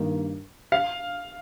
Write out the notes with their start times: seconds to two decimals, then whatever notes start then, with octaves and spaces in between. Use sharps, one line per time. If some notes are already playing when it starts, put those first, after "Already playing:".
Already playing: G2 D#3 A#3
0.72 F5